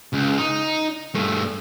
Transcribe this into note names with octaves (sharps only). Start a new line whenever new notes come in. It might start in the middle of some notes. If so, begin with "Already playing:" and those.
C#2
D#4
G2 A3